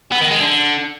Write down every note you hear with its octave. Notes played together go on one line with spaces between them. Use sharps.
B3
D#3
G#3
D3